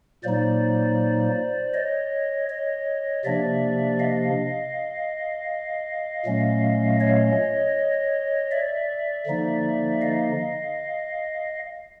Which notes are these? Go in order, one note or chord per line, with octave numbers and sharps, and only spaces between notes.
A#2 F#3 A#3 D#4 C5 D5
C#5 D#5
C#5 D#5
C3 F3 A#3 D4 D5 E5
D#5 F5
A#2 F#3 A3 C#4
C#5 D#5
D5 E5
D3 F3 A#3 D#4
D#5 F5